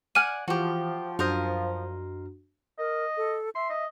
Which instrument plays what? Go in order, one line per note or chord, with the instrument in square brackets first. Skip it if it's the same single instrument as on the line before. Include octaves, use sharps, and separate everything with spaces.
[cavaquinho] D5 F#5 G#5 [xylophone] F6 D#7
[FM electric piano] E3 [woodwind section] F3 [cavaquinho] F#4 G4
[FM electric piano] F#2 D4 F#4 [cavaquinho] A#4 C5 D#5
[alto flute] A#4 [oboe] D#5
[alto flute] A4
[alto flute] E5 [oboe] C6
[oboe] D#5